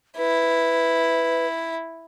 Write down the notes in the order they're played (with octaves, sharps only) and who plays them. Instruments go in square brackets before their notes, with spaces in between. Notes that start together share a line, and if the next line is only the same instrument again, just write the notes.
[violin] E4 [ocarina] B4